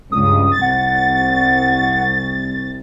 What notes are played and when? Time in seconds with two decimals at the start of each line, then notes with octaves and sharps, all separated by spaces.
0.12 C#2 G2 D#6
0.62 C2 F#5 A6